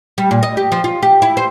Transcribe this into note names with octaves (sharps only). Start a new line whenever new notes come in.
G3
A#2
D#5
G4
F3
F4
G4
E4
C5